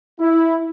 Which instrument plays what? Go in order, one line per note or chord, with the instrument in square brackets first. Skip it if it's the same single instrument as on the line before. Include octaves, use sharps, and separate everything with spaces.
[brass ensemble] E4